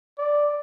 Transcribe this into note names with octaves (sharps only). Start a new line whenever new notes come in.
D5